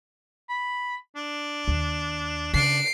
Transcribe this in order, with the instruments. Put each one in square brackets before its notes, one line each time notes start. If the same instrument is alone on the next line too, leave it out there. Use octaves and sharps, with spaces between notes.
[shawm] B5
D4
[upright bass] D#2
[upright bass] C#3 [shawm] D4 [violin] C7 D7